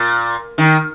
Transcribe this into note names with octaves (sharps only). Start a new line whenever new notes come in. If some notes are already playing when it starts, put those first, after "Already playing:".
Already playing: A#2
D#3